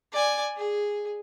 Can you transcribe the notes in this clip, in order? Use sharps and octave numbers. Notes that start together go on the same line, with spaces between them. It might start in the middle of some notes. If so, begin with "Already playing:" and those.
D5 G#5
G#4